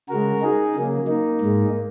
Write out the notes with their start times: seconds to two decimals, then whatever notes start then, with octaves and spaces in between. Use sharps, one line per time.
0.09 C#3 G#3 F#4 A#4
0.42 D#4 G#4
0.75 C#3 F#3 A#3
1.07 A#3 D#4
1.41 G#2 G#3